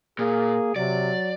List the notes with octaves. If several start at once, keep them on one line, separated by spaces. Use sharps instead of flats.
A#2 A#3 G#4
C3 F#3 D5